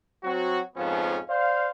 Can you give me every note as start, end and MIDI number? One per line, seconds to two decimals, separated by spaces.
0.24 0.61 54
0.24 0.61 60
0.24 0.61 66
0.76 1.18 41
0.76 1.18 44
0.76 1.18 53
0.76 1.18 59
0.76 1.18 61
1.29 1.68 72
1.29 1.68 74
1.29 1.68 77